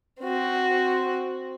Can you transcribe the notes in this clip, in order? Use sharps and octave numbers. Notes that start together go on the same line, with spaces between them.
C4 F#4